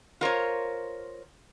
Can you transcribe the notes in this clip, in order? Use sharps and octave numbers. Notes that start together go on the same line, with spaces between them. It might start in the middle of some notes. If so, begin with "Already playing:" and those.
F4 A#4 C5 C#5